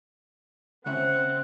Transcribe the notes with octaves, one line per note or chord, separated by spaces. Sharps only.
C#2 C#3 C4 E5 F#5